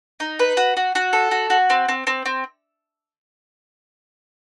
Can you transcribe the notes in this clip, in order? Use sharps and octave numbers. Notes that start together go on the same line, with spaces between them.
D#4
B4
F#4
F#4
F#4
A4
F#4
F#4
C4
C4
C4
C4